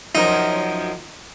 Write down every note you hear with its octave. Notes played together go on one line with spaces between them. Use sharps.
F#2 F3 D#4 A#4